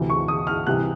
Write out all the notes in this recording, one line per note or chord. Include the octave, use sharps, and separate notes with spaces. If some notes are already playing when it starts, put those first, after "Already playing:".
Already playing: D2 C3 E3
C#6
D#6
F6
C2 C3 E3 F#6